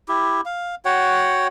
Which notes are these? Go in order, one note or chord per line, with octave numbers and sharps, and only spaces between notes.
E4 G4
F5
F#4 C#5 F#5 G5